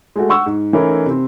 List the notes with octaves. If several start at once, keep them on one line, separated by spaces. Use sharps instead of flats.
G#3 A3 F#4
F#5 C#6 E6
G#2
E3 A3 C#4 D#4 E4 A#4
C3 C4